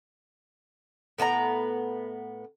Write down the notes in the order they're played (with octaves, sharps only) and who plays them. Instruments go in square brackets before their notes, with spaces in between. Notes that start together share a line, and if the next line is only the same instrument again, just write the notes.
[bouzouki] A2 B3 E4 A#5